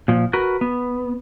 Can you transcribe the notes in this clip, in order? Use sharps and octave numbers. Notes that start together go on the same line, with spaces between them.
A#2 F3
F#4 A#4 B4
B3